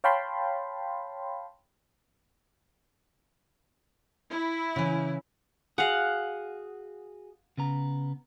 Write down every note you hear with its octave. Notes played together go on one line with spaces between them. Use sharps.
C#5 F5 G5 A5 B5 C6
E4
C#3 E3
F#4 G#4 F5 F#5
C#3 B3 A#5